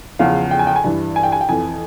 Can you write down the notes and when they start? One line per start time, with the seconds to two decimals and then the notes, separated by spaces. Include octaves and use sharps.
0.19 E2 C#3 F3 F5
0.51 G5
0.59 G#5
0.67 G5
0.76 G#5
0.84 G2 E3
1.16 G#5
1.23 G5
1.32 G#5
1.41 G5
1.49 F2 E3 G#5